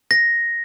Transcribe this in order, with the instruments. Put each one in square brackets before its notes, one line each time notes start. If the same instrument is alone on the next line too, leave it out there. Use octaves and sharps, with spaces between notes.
[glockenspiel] A#6